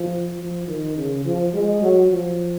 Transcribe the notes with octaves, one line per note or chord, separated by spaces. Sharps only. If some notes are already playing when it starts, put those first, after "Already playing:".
Already playing: F3
F3
D#3
C#3
F3
G#3
F#3
F3